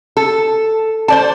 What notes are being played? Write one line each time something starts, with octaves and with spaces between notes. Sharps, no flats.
A4
C5 D5 A5